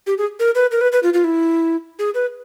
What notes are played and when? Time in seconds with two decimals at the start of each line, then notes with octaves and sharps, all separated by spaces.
0.07 G4
0.18 G#4
0.39 A#4
0.55 B4
0.72 A#4
0.81 B4
0.92 B4
1.03 F4
1.14 F4
1.24 E4
1.99 G#4
2.14 B4